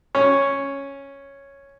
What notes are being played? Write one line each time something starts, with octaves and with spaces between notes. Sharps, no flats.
C#4 C#5